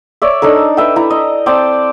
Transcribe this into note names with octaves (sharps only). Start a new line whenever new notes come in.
C#5 D5 E5
D4 D#4 A4 A#4
B4 E5 G5
E4 A#5
D#5
C4 D5 G5 A5